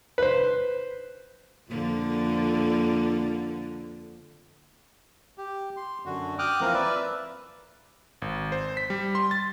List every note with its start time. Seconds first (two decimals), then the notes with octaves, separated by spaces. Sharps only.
0.18 B4 C5
1.70 F2 D3 A#3
5.38 G4
5.77 C6
6.06 F#2 D3 F#4
6.39 G5 D6 D#6 F6 F#6
6.61 E3 F3 A#3 C4 A#4
6.74 B4 D5 E5
8.22 G#1
8.52 C5
8.77 B6
8.90 G3
9.15 C6
9.31 A6